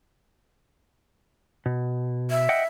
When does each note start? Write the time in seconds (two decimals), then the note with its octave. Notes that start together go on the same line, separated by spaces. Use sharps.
1.66 B2
2.30 E5
2.49 D#5 F#5 G5